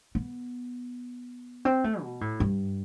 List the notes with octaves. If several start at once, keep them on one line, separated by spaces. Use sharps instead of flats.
B3
C4
A3
B2
A2
G2